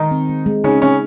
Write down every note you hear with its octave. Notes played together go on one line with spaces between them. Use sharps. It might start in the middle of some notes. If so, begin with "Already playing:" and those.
Already playing: D#3 G#3 D#4
C4
G#3
G#3
C#3 C#4 D#4
C#3 G#3 C#4